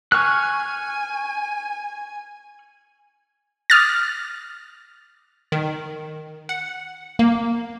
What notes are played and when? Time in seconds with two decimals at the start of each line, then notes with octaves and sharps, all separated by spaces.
0.12 G#5 C#6 F6 F#6
3.70 D6 D#6 F6 A6
5.52 D#3
6.49 F#5
7.19 A#3